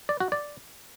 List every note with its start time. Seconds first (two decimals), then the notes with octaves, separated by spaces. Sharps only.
0.09 D5
0.20 F#4
0.32 D5